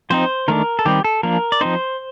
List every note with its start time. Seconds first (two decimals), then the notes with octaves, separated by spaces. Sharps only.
0.10 F3 C4 D#4 C5
0.48 D#3 A3 D4 A#4
0.79 A4
0.85 D#3 G3 C4 D#4 G4
1.04 A4
1.23 F3 A#3 D4 A#4
1.52 D5
1.61 F3 C4 D#4 C5